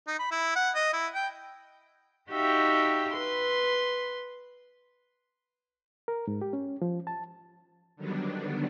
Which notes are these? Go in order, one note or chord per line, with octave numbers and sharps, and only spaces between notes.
D#4
B5
E4
F#5
D#5
E4
G5
D#4 F#4 G4 E5 F5 G5
B4 C6
A#4
G#2
G4
C#4
F3
A5
D3 D#3 F#3 G3 B3 D4